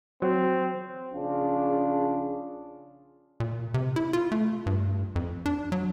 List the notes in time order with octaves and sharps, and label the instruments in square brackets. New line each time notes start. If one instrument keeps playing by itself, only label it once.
[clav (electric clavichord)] F#3 [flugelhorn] C4
[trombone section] A#1 C#3 C#4 D4 F4 G#4
[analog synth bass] A#2
C3
E4
F4
A3
G2
F2
D4
F#3